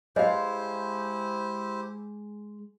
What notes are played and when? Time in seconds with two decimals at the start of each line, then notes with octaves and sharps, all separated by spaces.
0.16 G#3 E4 G4 C5 C#5 D#5 F5